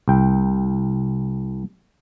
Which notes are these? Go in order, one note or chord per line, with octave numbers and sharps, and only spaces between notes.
C2 G5